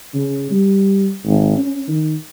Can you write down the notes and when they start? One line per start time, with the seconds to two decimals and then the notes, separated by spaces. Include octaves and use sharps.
0.15 C#3
0.51 G3
1.25 G#1
1.57 C#4
1.88 D#3